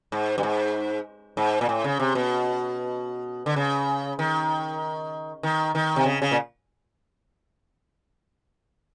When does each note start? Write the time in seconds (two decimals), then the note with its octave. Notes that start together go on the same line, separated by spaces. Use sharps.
0.12 G#2
0.38 G2
0.43 G#2
1.37 G#2
1.61 A#2
1.69 A2
1.84 C#3
2.00 C3
2.15 B2
3.46 D3
3.56 C#3
4.19 D#3
5.43 D#3
5.75 D#3
5.96 C3
6.05 C#3
6.22 C#3
6.31 A#2